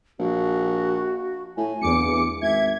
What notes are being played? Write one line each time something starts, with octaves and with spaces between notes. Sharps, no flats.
A#1 F#4
A2 G#5
D1 E2 D6 C#7
G#1 E5 G#6